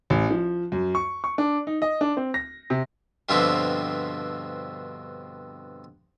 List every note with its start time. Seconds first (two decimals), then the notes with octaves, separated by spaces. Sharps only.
0.10 A1
0.31 F3
0.72 F#2
0.95 C#6
1.24 C#6
1.38 D4
1.67 D#4
1.82 D#5
2.01 D4
2.17 C4
2.34 A#6
2.70 C3
3.29 G2 B2 D3 F3 C4 E4